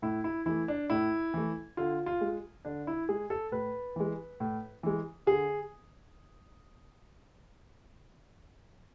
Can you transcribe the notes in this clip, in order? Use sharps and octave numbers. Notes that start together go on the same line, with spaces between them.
A2 E4
E4
E3 A3 E4
D4
A2 E4
E3 A3
D3 F4
F4
G#3
D3 D4
E4
G#3 G#4
A4
A2 B4
E3 G#3
A2
E3 G#3
D3 G#4